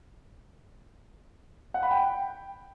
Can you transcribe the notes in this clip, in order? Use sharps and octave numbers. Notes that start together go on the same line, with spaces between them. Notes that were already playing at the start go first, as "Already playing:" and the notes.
F#5
B5
G5